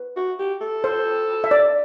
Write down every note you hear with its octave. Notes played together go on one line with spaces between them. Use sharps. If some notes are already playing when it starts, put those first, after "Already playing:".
Already playing: B4
F#4
G4
A4
C5
E5
D5